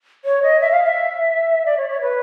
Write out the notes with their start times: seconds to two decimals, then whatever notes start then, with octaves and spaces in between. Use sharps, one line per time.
0.25 C#5
0.43 D#5
0.60 E5
0.71 F5
0.84 E5
1.66 D5
1.77 C#5
1.89 C#5
2.01 B4